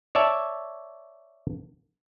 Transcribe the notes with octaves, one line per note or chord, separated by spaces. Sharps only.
C#5 D5 E5 A5